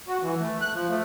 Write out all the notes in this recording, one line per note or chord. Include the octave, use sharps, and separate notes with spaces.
F#4
E3
A3
F#6
F3
A3